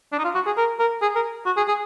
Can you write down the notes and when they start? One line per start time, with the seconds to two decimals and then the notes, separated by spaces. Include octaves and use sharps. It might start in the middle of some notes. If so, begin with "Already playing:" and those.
0.13 D4
0.19 D#4
0.24 F4
0.35 F#4
0.46 G#4
0.58 A#4
0.79 A#4
1.02 G#4
1.16 A#4
1.46 F#4
1.57 G#4
1.68 G#4